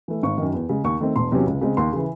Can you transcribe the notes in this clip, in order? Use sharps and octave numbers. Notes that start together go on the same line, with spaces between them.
E3 A3
G#1 C#6
F#2 D#3
E2
C#3 G#3
D#2 C#6
D#3 A3 C4
E1 C6
E2 C3 F#3 C#4
C#2
C#3 G#3 C4
D#2 C6
C#3 E3